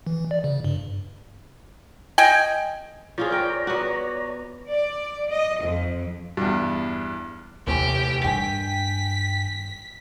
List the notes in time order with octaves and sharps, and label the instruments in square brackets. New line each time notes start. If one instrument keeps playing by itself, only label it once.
[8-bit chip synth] E3
D5
C#3
G2
[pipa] D#5 G5 G#5
[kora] F3 F4 G#4 [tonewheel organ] C#5 D5 A#5
[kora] A#4 G5
B3 F#4
[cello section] D5
D#5
F2
[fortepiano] E2 G2
[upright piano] F1 A2 G#5 [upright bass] D#2 D#3 [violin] G4
[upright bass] G2 D#3 [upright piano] G5 G#5 [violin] B6